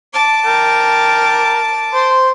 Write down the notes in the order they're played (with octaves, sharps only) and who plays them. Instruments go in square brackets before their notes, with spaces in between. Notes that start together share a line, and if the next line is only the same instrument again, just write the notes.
[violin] A5 D6
[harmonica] A#4 G5
C5 C6